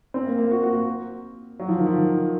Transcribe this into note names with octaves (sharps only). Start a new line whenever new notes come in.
C4
A#3
A#3
F#4
F#4
A#3
F#3
F3
D#3
F3
D#3